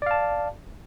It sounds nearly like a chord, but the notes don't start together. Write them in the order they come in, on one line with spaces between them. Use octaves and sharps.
D5 F5 A5